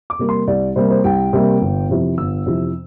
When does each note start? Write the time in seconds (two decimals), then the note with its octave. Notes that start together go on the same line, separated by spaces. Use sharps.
0.10 D6
0.19 C3 G3 A#3
0.29 C6
0.47 C2 D5
0.76 C3 G3 A#3 C5
0.90 C5
1.04 C2 G5
1.33 C3 G3 A#3
1.61 G1
1.89 F2 C3 E3
2.18 G1 E6
2.46 F2 C3 E3